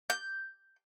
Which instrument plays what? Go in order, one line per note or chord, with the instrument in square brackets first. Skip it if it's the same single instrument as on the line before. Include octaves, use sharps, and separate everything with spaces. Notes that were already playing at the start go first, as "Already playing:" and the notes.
[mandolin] G6